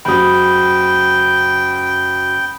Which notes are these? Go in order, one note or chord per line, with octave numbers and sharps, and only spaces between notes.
F#1 F#3 G5 B5 D#6